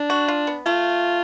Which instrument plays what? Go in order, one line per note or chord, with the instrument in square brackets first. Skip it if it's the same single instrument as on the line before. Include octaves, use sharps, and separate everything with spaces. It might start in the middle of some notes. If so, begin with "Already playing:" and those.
Already playing: [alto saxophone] D4
[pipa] F#4
F4
B3
[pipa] A3 [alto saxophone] F4